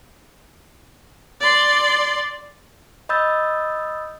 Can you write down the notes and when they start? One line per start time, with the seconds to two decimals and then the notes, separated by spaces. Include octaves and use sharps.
1.41 D5 C6
3.09 D#5 B5 D#6 E6 G6 A6